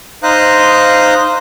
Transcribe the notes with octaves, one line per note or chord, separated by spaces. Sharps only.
D#4 C5 F5 A#5 D#6 F#6